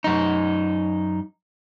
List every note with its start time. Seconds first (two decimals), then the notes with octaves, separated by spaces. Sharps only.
0.04 F#2 D#4